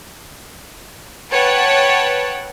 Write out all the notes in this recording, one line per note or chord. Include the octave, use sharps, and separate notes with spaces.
B4 C#5 F#5 G5 A5